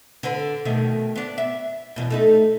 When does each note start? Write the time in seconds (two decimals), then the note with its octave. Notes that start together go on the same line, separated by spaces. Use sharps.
0.23 D3 B4
0.65 B2 D#3 A3
1.16 B3 D4
1.38 E5
1.96 E2 B2
2.10 A3 D#4 A4